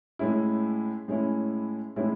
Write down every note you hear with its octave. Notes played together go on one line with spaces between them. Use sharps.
A2 G#3 C#4 E4
A2 G#3 C#4 E4
A2 G#3 C#4 E4